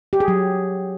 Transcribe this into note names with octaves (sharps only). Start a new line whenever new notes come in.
G4
G#4
F#3